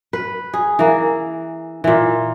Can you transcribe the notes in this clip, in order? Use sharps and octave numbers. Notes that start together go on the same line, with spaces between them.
B4
G#4
E3 A#3
A#2 E3